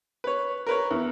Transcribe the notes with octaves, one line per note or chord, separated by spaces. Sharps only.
B4 C#5
A#4 B4 C#5
E2